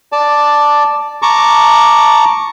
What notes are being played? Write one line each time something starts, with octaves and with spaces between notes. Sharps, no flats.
D5 A5
A5 A#5 C#6 D6